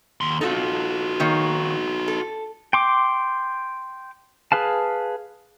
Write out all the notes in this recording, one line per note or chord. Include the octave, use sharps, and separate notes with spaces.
D#2 C6
C4 D#4 F4 F#4 A4
D#3 A#3 C#5
A4
G5 C6 D6
G#4 B4 F5 A5